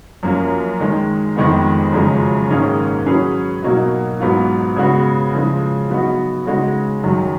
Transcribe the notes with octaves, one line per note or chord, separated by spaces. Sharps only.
F#2 F3 A#3 C#4
D#3 G#3 D#4
F2 D#3 G#3 B3
F#2 C#3 F3 G#3
G#2 D#3 A#3 C#4 G#4
F#3 C#4 G#4 B4
B2 F#3 A#3 D#4
G#2 F#3 B3 F4
C#3 G#3 B3 F#4
C#3 F3 G#3
F#3 B3 D#4 F#4
C#3 G#3 D#4 F#4
F#2 D#3 F#3